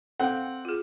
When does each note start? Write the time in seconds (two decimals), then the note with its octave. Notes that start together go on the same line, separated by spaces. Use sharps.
0.20 C4 A4 F5 F#5
0.65 F4 G#4